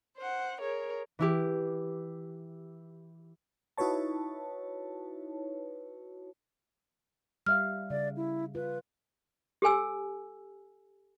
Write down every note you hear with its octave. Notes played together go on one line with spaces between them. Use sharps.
C5 F#5
G#4 A#4 C#5
E3 E4 G4
D#4 E4 F#4 B4 C#5 A5
G3 E5 F5 F6
C#3 D5
E4
F4 B4
G4 A4 G#5 E6